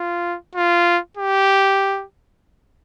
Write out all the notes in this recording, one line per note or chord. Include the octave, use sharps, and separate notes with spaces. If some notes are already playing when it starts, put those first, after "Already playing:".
Already playing: F4
F4
G4